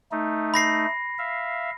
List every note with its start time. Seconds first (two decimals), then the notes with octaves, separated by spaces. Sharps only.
0.12 A3 D#4
0.54 B5 A#6 C7
1.18 E5 F5